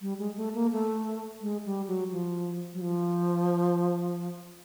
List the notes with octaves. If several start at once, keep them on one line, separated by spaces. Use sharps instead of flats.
G3
G#3
A3
A#3
A3
G#3
G3
F#3
F3
F#3
F3